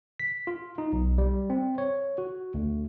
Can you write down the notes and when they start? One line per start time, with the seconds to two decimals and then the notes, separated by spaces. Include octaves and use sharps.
0.20 B6
0.47 F4
0.78 D#4
0.93 B1
1.18 G3
1.50 C4
1.78 C#5
2.18 F#4
2.54 D2